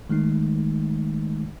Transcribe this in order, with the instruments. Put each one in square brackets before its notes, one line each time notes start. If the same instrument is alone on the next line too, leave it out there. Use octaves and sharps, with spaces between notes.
[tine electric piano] D#3 G#3 A3 D#4